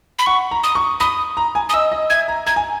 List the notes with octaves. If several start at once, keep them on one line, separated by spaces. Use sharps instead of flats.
B5
F#5 C#6
A#5
D#6
C#6
B5 D#6
A#5
G#5
D#6
D#5 E6
D#5
E5 G#6
A#5
A#5 G#6
G#5